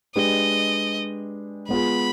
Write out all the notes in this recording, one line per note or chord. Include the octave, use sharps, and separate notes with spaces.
G#3 D4 G4 B4 D#5
G#3 B3 F4 G#4 B5